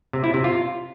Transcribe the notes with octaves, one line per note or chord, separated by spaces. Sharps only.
C3
E4
C3
F4